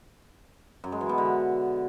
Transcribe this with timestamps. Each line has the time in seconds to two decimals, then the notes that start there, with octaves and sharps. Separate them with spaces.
0.84 F#2
0.92 G#3
1.01 E3
1.09 B2
1.18 D3